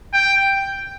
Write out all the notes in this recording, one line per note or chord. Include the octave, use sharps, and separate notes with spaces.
G5